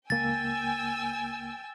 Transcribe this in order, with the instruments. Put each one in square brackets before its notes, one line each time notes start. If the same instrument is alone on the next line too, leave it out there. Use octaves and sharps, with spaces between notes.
[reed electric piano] C#2 A#3 [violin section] G5 G#5 E6 [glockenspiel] A6